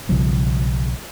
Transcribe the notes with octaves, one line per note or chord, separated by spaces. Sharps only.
B1 C#3 F3 G3